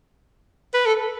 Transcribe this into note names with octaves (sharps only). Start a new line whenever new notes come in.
B4
A4